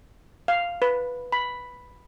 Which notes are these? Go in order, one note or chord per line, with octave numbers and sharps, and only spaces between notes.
F5
B4
B5